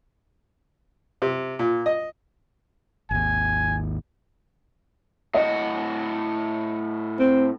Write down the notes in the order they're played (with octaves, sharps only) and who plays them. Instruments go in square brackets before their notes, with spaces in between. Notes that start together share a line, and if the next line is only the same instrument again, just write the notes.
[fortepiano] C3
A#2
D#5
[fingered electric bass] G#1 D#2 [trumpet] G#5
[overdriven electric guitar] A2 F#4 [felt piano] D#5
[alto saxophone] C4